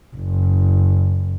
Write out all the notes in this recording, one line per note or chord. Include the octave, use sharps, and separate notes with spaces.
F#1